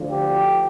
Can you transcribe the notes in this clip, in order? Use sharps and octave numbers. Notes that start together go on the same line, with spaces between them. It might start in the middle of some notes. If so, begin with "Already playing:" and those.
Already playing: D2 D3 F3
G4